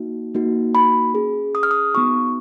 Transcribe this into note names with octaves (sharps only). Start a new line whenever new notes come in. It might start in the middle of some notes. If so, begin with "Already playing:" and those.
Already playing: A#3 D#4 F#4
A#3 D#4 F#4
B5
C#4 G#4
D#6
F6
D#6
B3 D#4 F#4 C#6